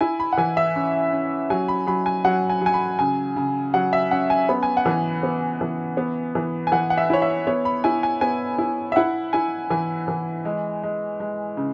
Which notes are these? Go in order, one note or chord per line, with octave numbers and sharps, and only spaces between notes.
E4 G#5
B5
F#5
E3 G#5
E5
C#4
C#4
F#3 G#5
B5
F#3 B5
G#5
F#3 F#5
G#5
F#3 G#5
B5
C#3 G#5
C#3
F#3 F#5
E5
C#4 F#5
G#5
B3 B5
G#5
F#5
E3 G#5
B3
E3
B3
E3
G#5
E3 F#5
F#5
E5
E4 C#5
E5
B3 C#5
B5
E4 G#5
G#5
B3 G#5
E4
E5
E4 F#5
E4 G#5
E3 G#5
E3
G#3
G#3
G#3
C#3